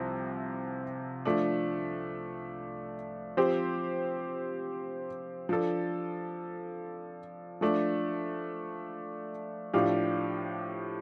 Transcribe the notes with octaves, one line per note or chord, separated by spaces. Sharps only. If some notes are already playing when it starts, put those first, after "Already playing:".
Already playing: C2 C3 F3
F3 A3 D4
F3 C4 G4 C5
F3 D4 A4
F3 A3 D4
A2 F3 D4 G4 F5